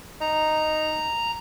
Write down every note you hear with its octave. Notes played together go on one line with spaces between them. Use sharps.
D#4 A#5